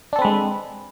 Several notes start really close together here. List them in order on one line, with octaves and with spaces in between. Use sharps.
D4 A4 C4 B4 G#3